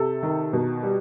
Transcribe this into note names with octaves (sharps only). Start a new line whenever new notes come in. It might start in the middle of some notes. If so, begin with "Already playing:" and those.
Already playing: C3 A4
D#3
B2
G3